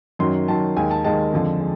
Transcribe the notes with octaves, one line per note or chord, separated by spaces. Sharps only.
F#2 D#3 F#3 C6
F#2 D#3 F#3 A5
D#2 D#3 G#3 G#5
A5
D#2 D#3 G#3 A5
F2 D3 F3 G#3
G#3